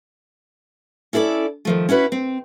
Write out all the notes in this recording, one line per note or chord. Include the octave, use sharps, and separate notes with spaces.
C#4 E4 A4 C5 D5
D#3 F3 A3
C#4 E4 F#4 B4
C4